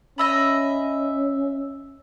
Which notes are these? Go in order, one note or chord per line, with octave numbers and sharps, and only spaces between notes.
C#4 D#5 E5 B5